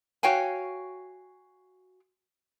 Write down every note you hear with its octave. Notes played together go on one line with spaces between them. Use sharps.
F#4 C#5 F5 G5 G#5